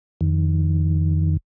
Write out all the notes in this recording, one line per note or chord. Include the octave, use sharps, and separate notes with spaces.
F2 D#3